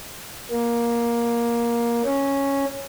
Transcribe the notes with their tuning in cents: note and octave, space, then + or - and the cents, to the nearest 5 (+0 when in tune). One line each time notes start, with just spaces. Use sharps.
A#3 +15
C#4 -5